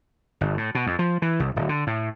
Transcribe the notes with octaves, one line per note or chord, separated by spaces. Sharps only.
G1
A2
B2
F2
F3
E3
C2
D1
D3
A2